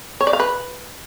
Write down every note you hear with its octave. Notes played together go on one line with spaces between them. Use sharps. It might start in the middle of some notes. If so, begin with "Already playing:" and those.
C#5
D5
F5
B4